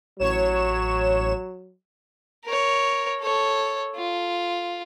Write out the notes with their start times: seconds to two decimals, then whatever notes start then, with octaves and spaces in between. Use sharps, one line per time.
0.19 A1 F#3 C#5 E7
2.45 A#4 C#5
3.21 A4 C#5
3.96 F4